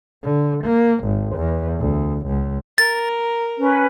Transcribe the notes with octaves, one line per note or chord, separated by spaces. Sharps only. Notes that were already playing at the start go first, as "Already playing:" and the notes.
D3
A#3
G#1
E2
D2
C#2
A#4 A6
C#4 B4